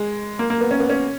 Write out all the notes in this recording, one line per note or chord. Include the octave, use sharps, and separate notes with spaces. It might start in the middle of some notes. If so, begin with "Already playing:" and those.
Already playing: G#3
A#3
A#3
B3
C#4
B3
C#4